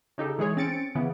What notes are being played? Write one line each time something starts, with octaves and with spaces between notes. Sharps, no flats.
C#3 D#4 G4 A4
E3 G#3 G#4 C#5
C4 C#4 A6 C#7 D7
C#3 E3 B3